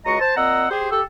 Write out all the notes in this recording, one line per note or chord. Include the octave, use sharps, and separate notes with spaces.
C#2 G#3 F#4 D#5 A#5 C#6
C5 A5
A#2 C4 D#5 F#5 A#5 E6
G4 G#4 C5
G4 A4